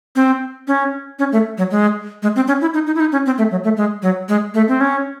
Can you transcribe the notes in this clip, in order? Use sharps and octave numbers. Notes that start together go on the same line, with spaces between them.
C4
C#4
C#4
A3
F#3
G#3
G#3
C4
C#4
E4
D#4
D#4
E4
D#4
C#4
C4
A3
F#3
A3
G#3
F#3
G#3
A3
C4
C#4